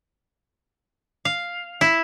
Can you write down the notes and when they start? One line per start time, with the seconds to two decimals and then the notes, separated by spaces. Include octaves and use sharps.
1.25 F5
1.81 E4